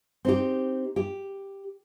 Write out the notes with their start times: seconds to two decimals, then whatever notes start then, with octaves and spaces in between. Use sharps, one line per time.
0.25 C4 D#4 G4
0.96 G4